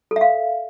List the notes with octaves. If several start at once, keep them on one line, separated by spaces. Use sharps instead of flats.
A4
E5
F5